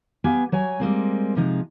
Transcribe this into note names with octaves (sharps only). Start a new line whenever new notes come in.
B3 G4 F5 G#5
F#3 C#5 G#5
G3 G#3 A#3 C4
C3 F3 G#3 D#4